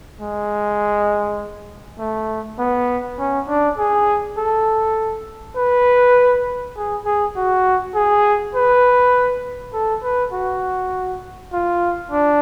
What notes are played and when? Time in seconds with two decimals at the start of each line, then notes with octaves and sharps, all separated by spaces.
0.21 G#3
1.99 A3
2.59 B3
3.19 C#4
3.49 D4
3.78 G#4
4.38 A4
5.56 B4
6.77 G#4
7.06 G#4
7.36 F#4
7.95 G#4
8.55 B4
9.74 A4
10.04 B4
10.33 F#4
11.53 F4
12.12 D4